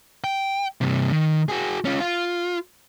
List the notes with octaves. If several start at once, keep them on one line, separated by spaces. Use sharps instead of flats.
G5
G2 C3
D#3
F#4 G#4
C#4 F4
F4